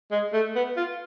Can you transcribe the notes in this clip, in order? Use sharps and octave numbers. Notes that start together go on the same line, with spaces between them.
G#3
A3
B3
F4